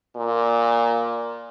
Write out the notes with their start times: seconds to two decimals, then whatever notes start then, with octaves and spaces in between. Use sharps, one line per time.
0.16 A#2